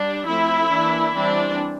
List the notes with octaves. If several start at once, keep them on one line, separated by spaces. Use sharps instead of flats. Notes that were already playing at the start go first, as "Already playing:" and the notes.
Already playing: G3 D4
F3 A3 C4 E4
E3 A#3 D4
E3 G3 C4 D4